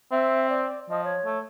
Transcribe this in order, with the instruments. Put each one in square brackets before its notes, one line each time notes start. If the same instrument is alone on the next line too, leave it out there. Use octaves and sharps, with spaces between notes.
[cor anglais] C4 [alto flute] E5
[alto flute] D5
[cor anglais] F3 [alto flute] D#5
[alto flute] C#5
[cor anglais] A3